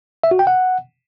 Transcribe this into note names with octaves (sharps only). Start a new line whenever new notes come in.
E5
F#4
G5
F#5